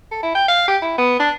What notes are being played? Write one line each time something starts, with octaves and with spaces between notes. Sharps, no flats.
A4
E4
G5
F5
G4
E4
B3
D4